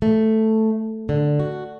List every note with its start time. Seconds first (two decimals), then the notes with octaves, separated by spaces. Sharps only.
0.02 A3
1.09 D3
1.39 F#4